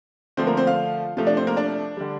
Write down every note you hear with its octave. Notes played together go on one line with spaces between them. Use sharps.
D3 F3 A3 C4 C5
A#3 A#4
C4 C5
F4 F5
C3 F3 A3 F4 F5
D4 D5
C4 C5
A#3 A#4
D4 D5
D3 G3